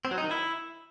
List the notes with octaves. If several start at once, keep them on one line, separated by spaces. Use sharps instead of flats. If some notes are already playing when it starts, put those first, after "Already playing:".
C4
F#3
D#4
D#3
E4